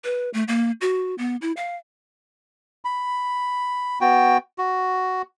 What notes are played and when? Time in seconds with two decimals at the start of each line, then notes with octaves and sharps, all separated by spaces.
0.04 B4
0.34 A3
0.48 A#3
0.81 F#4
1.18 B3
1.42 E4
1.57 F5
2.85 B5
4.01 B3 F#4 G5
4.58 F#4